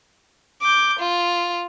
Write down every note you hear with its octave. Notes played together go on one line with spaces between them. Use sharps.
D6 G6
F4